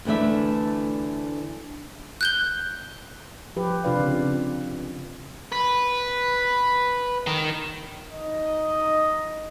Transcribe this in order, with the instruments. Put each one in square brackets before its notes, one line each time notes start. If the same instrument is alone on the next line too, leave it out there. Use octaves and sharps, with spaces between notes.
[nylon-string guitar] D2 E3 A3 D4 E5
[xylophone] F#6 G6 G7
[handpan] F3 G4 B4
C3 D4 F4 B4 D5 F5
C#3
F4
[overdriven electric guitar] B4
D#3
[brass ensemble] D#4 D#5